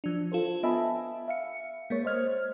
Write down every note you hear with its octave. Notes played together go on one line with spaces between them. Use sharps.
F3 D4
F4 A4 C5
B3 D#5 E5 G#5 A5 B5
E5 F5 C#7
G#3 A#3 C#5
C5 D#5 F6 G#6